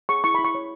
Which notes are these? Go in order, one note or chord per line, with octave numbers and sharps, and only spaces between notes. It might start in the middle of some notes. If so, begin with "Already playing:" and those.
G#4 C#6
E4 C#6
B5
E4
C#6
C#5